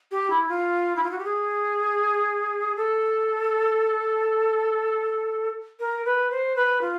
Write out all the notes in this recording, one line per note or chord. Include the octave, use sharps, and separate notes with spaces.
G4
E4
F4
E4
F4
F#4
G4
G#4
A4
A#4
B4
C5
B4
F4